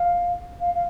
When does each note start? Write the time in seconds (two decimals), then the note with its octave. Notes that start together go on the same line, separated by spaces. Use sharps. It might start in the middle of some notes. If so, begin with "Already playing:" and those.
Already playing: F5
0.60 F5
0.74 F5